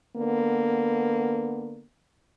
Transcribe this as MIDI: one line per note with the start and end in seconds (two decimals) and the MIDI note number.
0.17 1.84 50
0.17 1.84 58
0.17 1.84 59